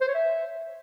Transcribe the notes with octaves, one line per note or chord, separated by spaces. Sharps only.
C5
C#5
E5